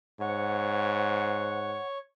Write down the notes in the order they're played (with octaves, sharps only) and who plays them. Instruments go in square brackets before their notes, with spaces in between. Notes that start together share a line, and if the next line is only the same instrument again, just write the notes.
[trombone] G#2 [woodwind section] C5 F#5 [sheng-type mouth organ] C#5